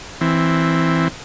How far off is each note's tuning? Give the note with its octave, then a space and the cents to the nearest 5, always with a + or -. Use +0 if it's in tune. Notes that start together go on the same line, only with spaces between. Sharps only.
E3 +0 C4 +0